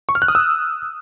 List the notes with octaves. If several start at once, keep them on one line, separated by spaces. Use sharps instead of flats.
C#6
F6
F#6
D#6
E6